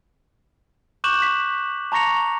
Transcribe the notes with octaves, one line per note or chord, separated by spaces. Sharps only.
C#6 D6 F#6 G6 E7 F#7
B6
A5 A#5 C#6 A#6 C#7 F7